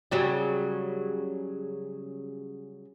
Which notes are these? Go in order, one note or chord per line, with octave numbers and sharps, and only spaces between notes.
C#3 F#3 G3